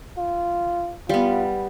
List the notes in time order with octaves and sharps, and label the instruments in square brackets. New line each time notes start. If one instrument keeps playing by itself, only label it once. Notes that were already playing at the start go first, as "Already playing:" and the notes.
[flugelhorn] F4
[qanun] G3 B3 [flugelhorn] F4